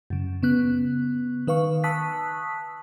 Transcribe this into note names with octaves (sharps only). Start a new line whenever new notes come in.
F#2 C#3
C#3 B3 F#6
D#3 B4 F5 C#6
A5 C#6 D#6 E6 F#6 B6